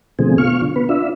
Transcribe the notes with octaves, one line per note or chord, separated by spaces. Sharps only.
B2 D3 F3 A3 C4 G#4
B2 F4 C#6 F6
D3
B3 B4
D4 F4 E5